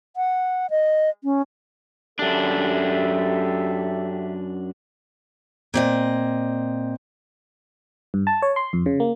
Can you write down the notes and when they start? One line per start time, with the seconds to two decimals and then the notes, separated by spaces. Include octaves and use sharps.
0.16 F#5
0.70 D#5
1.24 C#4
2.19 F#2 D4 G4 A4 E5
5.74 A#2 C4 D#5
8.14 G2
8.27 A5
8.42 C#5
8.56 C6
8.73 F2
8.86 C#3
9.00 A#3